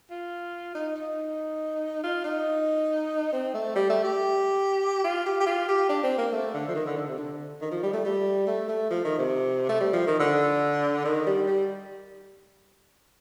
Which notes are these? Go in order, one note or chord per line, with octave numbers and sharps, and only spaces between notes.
F4
D#4
D#4
F4
D#4
C4
A3
G3
A3
G4
F4
G4
G4
F4
G4
D4
C4
A#3
A3
D3
F3
D#3
D3
D3
C3
D3
D#3
F3
G3
A3
G3
A3
A3
F3
D#3
C3
A3
G3
F3
D#3
D3
D#3
G3
G3